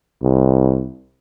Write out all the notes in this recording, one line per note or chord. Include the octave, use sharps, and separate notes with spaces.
C2